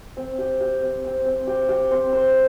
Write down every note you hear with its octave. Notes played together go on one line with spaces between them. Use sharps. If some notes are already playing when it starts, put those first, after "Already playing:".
C4
G4
G4
C4
C4
C4
G4
G4
C4
C5